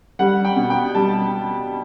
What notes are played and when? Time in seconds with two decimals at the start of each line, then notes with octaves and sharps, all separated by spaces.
0.19 G3 F#5
0.45 G5
0.56 B2
0.70 G5
0.95 G3 A5